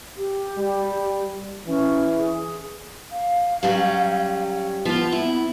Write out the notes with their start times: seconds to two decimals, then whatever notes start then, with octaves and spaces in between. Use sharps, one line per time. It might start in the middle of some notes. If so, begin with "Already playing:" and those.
0.17 G4
0.58 G3
1.67 E3 C#4
2.16 G#4
3.11 F5
3.63 F#3 G3 C#4
4.85 F3 B3 F4
5.12 E4